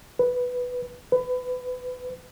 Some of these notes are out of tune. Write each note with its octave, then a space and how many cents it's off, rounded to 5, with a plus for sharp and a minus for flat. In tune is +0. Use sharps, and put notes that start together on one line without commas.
B4 +5
B4 +25